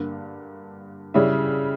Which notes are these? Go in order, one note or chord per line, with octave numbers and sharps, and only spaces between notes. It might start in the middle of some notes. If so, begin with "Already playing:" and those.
Already playing: G2 D3 A#3
C#3 G3 C#4 E4